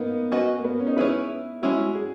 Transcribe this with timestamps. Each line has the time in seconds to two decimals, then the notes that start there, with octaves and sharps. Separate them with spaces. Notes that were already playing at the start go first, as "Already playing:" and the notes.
Already playing: A#3 B3 D#4
0.32 C#4 F#4 B4 D#5
0.59 A#3
0.64 B3
0.79 C#4
0.87 D#4
0.96 C#4 E4 G#4 B4
1.62 G#3 C#4 E4 F#4
1.78 F#4
1.95 G#4